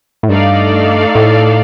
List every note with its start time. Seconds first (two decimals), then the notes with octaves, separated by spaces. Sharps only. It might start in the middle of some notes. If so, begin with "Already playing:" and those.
0.23 A2
0.29 G2 A3 D#4 A4 D5 F5
1.15 A2